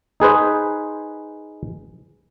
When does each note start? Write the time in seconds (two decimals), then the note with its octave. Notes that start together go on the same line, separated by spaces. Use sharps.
0.20 D#4 G#4 B4 C5